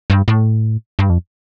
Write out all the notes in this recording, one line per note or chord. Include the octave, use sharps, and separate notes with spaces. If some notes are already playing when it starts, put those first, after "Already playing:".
G2
A2
G2
F2